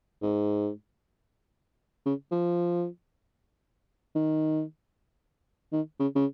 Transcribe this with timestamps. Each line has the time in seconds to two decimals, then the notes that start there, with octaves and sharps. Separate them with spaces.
0.22 G#2
2.06 C#3
2.31 F3
4.15 D#3
5.72 D#3
5.99 C#3
6.15 C#3